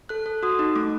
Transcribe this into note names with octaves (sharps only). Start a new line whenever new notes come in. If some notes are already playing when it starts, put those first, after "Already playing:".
A4 F#6
A4
F#4 D#6
D#4
A3 D6